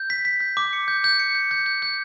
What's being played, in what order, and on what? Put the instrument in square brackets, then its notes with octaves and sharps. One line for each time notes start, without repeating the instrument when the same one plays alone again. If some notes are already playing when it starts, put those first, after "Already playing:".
Already playing: [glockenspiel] G6
B6
B6
G6
D6
C#7
G6
G6
C#7
G6
G6
G6
G6